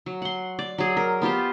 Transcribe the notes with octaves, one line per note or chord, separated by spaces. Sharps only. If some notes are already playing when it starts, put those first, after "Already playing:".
F#3
F#5 C6
D5
F#3 G#4
A#4
B3 F4 G4 C5